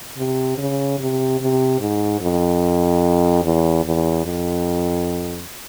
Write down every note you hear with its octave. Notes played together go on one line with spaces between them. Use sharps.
C3
C#3
C3
C3
G#2
F2
E2
E2
F2